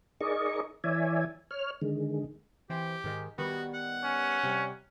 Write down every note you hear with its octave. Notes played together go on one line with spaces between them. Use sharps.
D#4 G#4 A#4 D5 D#5 C#6
E3 C#5 D5 E5 G#5
C#5 F6
D3 D#3 G#3
E3 C4 G4
G#2 D#3 G#3
D#3 G3 B3 F#4
F#5
C#4
C3 G3